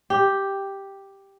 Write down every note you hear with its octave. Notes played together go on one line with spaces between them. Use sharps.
G4